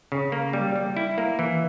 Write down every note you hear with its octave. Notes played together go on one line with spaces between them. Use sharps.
C#3
A#3
G3
G3
E4
A#3
E3